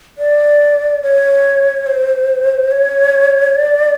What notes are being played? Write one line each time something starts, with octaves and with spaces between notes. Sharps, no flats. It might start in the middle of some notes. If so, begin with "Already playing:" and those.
D5
C#5
C5
C#5
D5